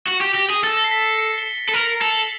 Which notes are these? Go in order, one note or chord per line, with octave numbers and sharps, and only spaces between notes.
F#4
G4
G4 A#6
G#4
A4 A6
A#6
C7
B6
C7
C#7
G7
G7
A4
A#4 F#7
A4 F7